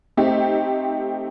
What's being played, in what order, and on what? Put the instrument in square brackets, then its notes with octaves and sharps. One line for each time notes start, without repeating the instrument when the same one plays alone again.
[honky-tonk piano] A3 C4 D#4 G4